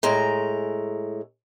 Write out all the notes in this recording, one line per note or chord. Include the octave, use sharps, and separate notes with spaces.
A2 G#3 A#5